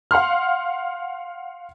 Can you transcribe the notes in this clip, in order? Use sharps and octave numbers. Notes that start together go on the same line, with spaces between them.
F5 F#5 C6 F6